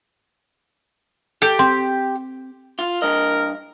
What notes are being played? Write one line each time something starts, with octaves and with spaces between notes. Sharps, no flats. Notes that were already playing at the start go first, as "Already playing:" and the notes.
G4 A4
C4
F4
G2 A#4 D#5